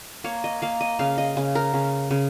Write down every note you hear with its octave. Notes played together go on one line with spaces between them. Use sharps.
A#3 C#5
D#5
A#3 F5
D#5
C#3 F5
D#5
C#3
A#4
C#3
C#3